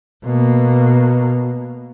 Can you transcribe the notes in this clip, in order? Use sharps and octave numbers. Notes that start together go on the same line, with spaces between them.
B2 A#3